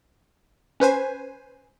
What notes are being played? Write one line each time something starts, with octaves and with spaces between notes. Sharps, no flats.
C#4 B4 C5 G#5